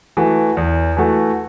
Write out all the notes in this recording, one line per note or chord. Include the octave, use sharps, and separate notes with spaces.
E3 A3 F#4
E2
E3 A3 F#4